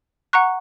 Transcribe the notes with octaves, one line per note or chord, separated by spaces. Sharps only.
F#5 A#5 C#6 F#6